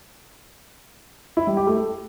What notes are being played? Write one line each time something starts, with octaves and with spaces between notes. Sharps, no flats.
E4
G3
G4
A3
A4